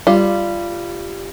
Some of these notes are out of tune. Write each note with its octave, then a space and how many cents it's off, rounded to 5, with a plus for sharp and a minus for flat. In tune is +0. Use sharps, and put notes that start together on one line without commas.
G3 +0 F4 -20